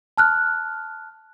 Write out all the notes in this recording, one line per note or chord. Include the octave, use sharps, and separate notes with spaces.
A5 F6 F#6